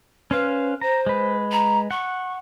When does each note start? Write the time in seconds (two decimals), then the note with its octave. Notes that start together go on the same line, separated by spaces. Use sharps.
0.31 C#4 B4 C5 F5
0.81 C5 A#5
1.06 G#3 B4
1.51 A#5
1.91 F#5 C#6